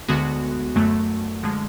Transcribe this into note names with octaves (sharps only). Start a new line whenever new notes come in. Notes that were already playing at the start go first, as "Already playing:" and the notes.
D2 D3 G#3 B3 F#4
F#2 D3 F#3 A3
D3 F3 G#3